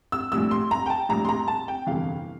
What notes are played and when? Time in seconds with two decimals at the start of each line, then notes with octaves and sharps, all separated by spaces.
0.12 E6
0.32 A#1 A2 G3 E6
0.51 C6
0.71 A#5
0.86 G5
0.90 A5
1.09 A#1 A2 G3 A#5
1.25 C6
1.29 A#5
1.48 A5
1.68 G5
1.86 G1 F2 C3 E3 F5